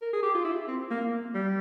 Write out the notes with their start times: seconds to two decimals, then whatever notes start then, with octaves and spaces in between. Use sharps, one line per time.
0.01 A#4
0.13 G#4
0.23 G4
0.34 F4
0.45 E4
0.68 C4
0.90 A#3
1.35 G3